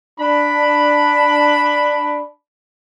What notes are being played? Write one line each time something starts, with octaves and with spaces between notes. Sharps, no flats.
D4 B5